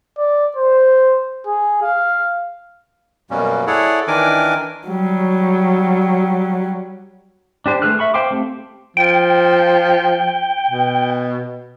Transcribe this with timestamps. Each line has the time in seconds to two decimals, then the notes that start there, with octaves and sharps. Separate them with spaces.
0.17 D5
0.57 C5
1.46 G#4
1.82 F5
3.31 F#2 B2 G3 A#3 C#4
3.67 E4 G#4 A4 C#5 D5 F#5
4.08 D#3 E3 D4 A#4 G#5 D6
4.87 F#3 G3
7.66 D4 G4 C5
7.82 A3 G#4 B4 F6 F#6
7.99 E5 B5 C#6
8.14 C5 F5 G5 C6 D6
8.31 A3 C4 G4
8.97 F3 G5
10.71 B2